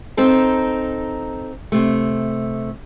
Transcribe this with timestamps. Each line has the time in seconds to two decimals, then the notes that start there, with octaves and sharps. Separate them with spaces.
0.17 C4 D#4 A4
1.72 C3 A3